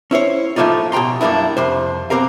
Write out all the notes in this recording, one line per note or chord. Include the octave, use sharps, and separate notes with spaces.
C#4 E4 C5 C#5
A2 F3 A3 A#3 D#4 F4
B2 G4 G5 A#5 C6
F#2 G3 A#3 D4 E4
F2 C3 C5
B2 C4 G4 A#4 F5